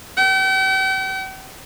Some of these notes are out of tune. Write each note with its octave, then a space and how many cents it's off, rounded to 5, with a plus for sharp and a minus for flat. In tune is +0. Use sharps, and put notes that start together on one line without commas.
G5 -45